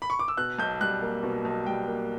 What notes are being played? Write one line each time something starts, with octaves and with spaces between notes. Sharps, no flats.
B5
C#6
D6
E6
B2 F#6
B1 G6
G3 F#6
A#3
B2
B1
G3 G5
A#3